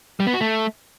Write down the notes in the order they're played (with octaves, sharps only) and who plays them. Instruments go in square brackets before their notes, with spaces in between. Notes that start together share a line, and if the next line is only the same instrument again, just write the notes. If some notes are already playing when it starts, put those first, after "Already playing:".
[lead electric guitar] G3
B3
F#4
A3